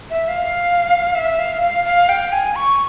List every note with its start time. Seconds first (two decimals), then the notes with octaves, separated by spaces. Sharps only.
0.10 E5
0.28 F5
1.15 E5
1.39 F5
1.62 F5
1.85 F5
2.09 G5
2.32 G#5
2.56 C#6